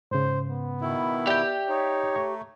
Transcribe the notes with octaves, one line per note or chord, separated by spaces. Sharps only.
G#2 C#3 C5
B3
B2 D#3 E4
G4 D5 E5 G5 G6
D#4 C#5
A3 A#5 C#6